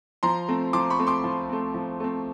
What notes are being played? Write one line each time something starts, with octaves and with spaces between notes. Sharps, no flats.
F3 A#5 C6
A3 C4
F3 C6 D6
B5 C#6
A3 C4
C6 D6
F3
A3 C4
F3
A3 C4